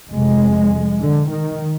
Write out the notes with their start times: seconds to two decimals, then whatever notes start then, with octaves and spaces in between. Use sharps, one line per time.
0.11 F1 F2 C3 G#3
1.01 D3
1.30 D#3